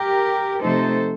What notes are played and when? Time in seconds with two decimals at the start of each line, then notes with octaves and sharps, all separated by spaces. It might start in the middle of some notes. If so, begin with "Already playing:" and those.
Already playing: G4 A#4
0.62 C3 F3 A3 D#4 A4 C5